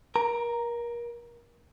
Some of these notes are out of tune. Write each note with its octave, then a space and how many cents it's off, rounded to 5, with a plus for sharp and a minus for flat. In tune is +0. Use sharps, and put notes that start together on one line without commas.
A#4 +30 A#5 +0